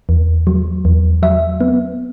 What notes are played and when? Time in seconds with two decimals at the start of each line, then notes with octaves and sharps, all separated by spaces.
0.09 E2
0.47 F#3
0.85 E2
1.23 F#3 E5
1.61 B3